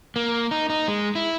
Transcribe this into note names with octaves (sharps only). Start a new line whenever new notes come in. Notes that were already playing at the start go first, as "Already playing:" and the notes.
A#3
D#4
D#4
G#3
E4